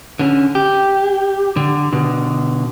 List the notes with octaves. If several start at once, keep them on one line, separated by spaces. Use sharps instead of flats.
D3 C#4
G4
D3
B2 D3